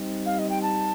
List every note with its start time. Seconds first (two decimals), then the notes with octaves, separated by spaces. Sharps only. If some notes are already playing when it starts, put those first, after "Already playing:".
Already playing: G3 C4 D#4
0.26 F5
0.39 D#5
0.50 G5
0.62 A5